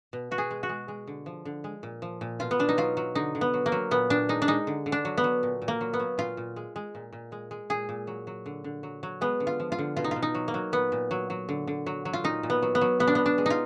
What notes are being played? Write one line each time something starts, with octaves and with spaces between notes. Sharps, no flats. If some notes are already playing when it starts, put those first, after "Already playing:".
B2
B2 F#4
G#4
G#3
F#4
G#3
G#3
D3
F3
D3
G#3
A#2
F3
A#2
B2 F4
B3
B2 D4
D#4
F#3 F4
F#3
D3 D#4
D3
B3
F#3
A#3
F#3
A#2 B3
A#2 D4
G#3 D#4
D4
G#3 D#4
D3
D3
D4
F#3
B3
F#3
A#2
A#2
A#3
F#3
B3
F#3
A#2 F4
A#2
G#3
G#3
A#2
A#2
G#3
G#3
A#2 G#4
A#2
F#3
F#3
D3
D3
F#3
F#3
G#3 B3
D3
F4
F3
F4
D3
B2 F4
D#4
B2 F4
D#4
F#3
A#3
F#3
A#2 B3
A#2
F#3
F#3
D3
D3
F#3
F#3
F4
A#2 D#4
A#2
B3
F#3
B3
F#3
B2 B3
D4
B2 B3
D4
G#3
D#4 F4